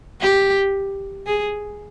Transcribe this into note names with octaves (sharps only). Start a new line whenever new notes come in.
G4
G#4